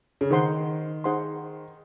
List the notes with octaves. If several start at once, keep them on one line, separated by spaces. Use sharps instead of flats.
C#3
D#3 D#4 G#4 C5 F#5 C6
D#4 G#4 C5 F#5 C6